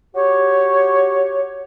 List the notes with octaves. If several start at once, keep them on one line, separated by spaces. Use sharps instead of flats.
F#4 G4 C#5